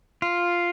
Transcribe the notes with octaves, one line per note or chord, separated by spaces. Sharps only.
F4